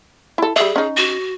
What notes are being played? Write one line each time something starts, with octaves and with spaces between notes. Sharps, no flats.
E4 A4
G3 G#4 E5
C#4 D#4
F#4